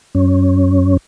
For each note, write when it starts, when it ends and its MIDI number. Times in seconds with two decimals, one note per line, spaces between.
0.15 0.97 42
0.15 0.97 61